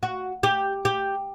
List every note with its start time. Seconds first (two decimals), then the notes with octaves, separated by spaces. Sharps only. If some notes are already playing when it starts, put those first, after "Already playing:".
0.03 F#4
0.43 G4
0.85 G4